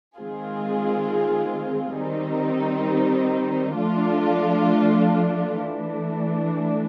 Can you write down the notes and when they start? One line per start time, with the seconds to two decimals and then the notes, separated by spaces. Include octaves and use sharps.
0.17 D#3 G#3 C4 F4 G#4
1.98 D#3 G3 C4 D#4
3.78 F3 A3 D4 F4
5.60 E3 A3 D4